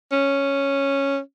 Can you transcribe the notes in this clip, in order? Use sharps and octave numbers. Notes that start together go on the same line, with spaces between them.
C#4